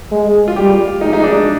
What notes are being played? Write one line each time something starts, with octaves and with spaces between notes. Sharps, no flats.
G#3
F4
G3 G4
G#3 D#4
D#4
D4